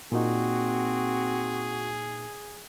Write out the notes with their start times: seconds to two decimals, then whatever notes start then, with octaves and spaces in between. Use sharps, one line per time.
0.12 A#2 A#3 C4 D#4 F#4 G#4